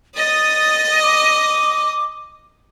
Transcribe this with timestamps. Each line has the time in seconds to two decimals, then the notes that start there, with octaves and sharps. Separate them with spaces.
0.17 D#5 D#6 A6
1.02 D6